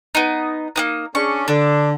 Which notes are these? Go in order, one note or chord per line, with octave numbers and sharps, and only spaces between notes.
B3 D#4
A#3 B3 D#4
C#4 D4 G#4 C#6
D3 D4